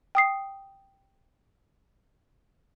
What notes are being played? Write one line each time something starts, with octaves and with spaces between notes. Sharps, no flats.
G5 D#6 C7